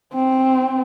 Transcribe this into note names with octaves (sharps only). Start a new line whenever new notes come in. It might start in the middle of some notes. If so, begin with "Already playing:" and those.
C4